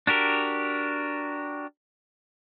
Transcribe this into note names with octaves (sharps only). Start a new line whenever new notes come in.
D4 F#4 G4 A#4